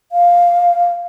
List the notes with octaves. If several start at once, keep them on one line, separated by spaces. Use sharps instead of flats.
F5